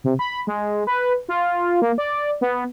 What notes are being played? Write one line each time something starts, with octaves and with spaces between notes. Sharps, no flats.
C3
B5
G#3
B4
F4
A#3
D5
B3